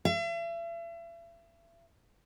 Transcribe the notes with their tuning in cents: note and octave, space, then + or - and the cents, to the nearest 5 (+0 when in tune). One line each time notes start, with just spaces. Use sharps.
E5 +40